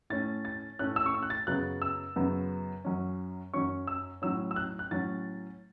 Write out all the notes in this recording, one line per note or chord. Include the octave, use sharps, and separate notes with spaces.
A2 A3 C#4 A6
A6
A2 A3 C#4 F#6
E6
C#6
E6
F#6
A6
F#2 C#3 F#3 B3 F#6
E6
F#2 C#3 F#3 B3
F#2 F#3 C#4
F#2 F#3 C#4 C#6
E6
A2 F#3 C#4 E6
E6
F#6
F#6
A2 F#3 C#4 A6